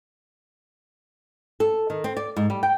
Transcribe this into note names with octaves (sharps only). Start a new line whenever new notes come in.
A4
D#3
C4
D5
G#2
G3
G5